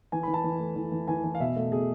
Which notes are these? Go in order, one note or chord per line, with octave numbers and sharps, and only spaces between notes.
E3 G#5
E3 B5
A5
E3
A3
E3
E3
E3 G#5
E3
F5
B2 E5
A3
B2 G#4